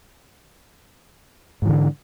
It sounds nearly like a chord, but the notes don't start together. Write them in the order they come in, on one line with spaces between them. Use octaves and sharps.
G#2 E3 D3